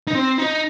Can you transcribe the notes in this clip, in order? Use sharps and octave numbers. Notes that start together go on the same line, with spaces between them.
D#4
C4
D#4